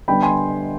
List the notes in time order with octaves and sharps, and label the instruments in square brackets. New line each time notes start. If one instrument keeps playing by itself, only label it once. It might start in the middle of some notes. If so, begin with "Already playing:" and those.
[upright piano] D3 G3 B3 D4 G5 B5
G#5 C6